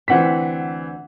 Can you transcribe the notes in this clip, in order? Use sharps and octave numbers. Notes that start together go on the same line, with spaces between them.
D2 E3 C4 F#5 B6